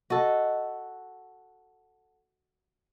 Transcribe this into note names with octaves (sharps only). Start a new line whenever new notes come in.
F#4 A4 D#5